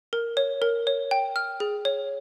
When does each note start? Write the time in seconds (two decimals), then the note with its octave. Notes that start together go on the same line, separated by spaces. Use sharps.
0.13 A#4
0.37 C#5
0.62 A#4
0.87 C#5
1.11 G5
1.36 F6
1.60 G#4
1.85 C#5